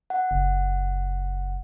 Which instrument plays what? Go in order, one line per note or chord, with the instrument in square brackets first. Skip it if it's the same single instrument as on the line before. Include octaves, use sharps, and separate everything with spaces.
[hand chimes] F#5
[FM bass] F#1